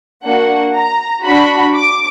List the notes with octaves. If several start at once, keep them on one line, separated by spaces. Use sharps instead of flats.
A#3 D4 F#4 F#5
A#5
D4 F#4 B5
D6